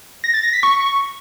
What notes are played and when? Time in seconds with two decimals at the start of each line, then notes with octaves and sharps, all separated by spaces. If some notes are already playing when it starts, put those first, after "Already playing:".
0.24 A#6
0.34 A6
0.43 A#6
0.53 B6
0.63 C#6